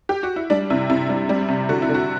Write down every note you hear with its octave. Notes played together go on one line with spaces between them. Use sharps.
G4
F#4
E4
G3 D4
C3 E4
C3 E4
G3 E4
G3
C3
D3 F#4
E4
D3
F#4